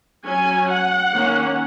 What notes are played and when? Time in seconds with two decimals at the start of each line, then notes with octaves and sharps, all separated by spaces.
0.24 F#3 C#4 G#5
0.68 F#5
1.12 D#3 A#3 C#4